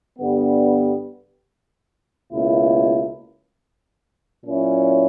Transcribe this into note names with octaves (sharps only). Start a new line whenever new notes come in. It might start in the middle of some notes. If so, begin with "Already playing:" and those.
G2 D3 G3 B3
C#2 B2 A#3 E4
A#2 F#3 C#4 E4